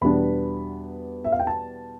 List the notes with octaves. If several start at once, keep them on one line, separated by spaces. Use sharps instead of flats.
E2 B2 G3 B3 D4 B5
E5
F5
G5
A5